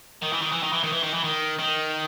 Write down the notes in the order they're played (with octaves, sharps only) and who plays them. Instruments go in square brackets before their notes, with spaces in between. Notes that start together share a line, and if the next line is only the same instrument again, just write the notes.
[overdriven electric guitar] D#3
E3
D#3
E3
D#3
E3
D#3
E3
D#3
E3
D#3
D#3